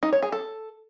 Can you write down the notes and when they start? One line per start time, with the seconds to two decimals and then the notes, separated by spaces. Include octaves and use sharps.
0.03 D#4
0.13 C#5
0.22 G#4
0.32 A4